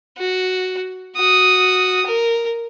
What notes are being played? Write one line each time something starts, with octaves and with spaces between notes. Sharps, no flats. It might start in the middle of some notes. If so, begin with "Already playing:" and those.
F#4
F#4 D#6
A#4